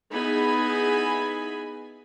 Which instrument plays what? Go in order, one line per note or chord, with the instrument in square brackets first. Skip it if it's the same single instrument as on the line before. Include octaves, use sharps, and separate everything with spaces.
[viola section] B3 D#4 E4 G#4 G#5 B5